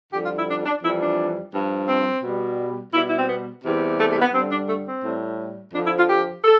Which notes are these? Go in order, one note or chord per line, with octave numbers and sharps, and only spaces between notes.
F2 D3 G3 G4
F4
E4
D4
D4
F2 E3 G3 E4
D4
G2 F3
C4
B2 G3
B2 G3 E4
E4
C4
B3
E2 C3 E3 G3
A3
A3
B3
G2 D3 G3 C4
D4
A3
C4
A2 G3
F2 D3 F3 D4
E4
F4
G4
A4